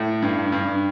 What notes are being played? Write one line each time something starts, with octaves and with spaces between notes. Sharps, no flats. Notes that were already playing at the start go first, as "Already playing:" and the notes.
Already playing: A2
G2
G2